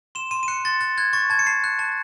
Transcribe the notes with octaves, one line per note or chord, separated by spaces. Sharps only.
C6 E7
C6 D#7
D#7
F#6 C#7
C6 A6
F#6 A6
F#6 G#6
C#6 A6
A5 G#6
C#7
A5 C7
F#6
A5